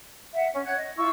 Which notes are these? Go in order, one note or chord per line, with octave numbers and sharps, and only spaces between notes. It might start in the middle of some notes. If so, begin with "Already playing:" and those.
E5 F#5
C#4
C#5 F#5 F#6 G#6
D#5
E4 F4 C#6 E6